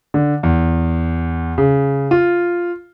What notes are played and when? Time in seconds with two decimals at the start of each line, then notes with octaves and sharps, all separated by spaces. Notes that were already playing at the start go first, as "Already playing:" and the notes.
0.14 D3
0.43 E2
1.58 C#3
2.11 F4